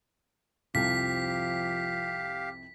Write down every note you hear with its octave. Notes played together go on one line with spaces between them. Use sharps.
C2 F2 C3 F3 G4 F5 B6